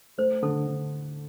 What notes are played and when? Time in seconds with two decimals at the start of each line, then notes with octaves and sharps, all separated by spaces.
0.18 A3 C5
0.42 D3 A4
0.67 D3